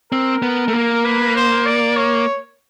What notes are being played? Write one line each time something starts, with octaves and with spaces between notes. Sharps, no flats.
C4 A#4
B3
A3
A#3
B4
C5
D5
C#5